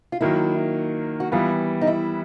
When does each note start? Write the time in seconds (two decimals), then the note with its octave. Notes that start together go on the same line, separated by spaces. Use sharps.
0.12 F4
0.21 D#3 F#3 A#3 E4
1.20 F#4
1.32 E3 G3 B3 F4
1.81 D#4
1.87 E4